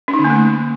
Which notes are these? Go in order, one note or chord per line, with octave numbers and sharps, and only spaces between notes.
C#4
D#4
D3
A#3
A3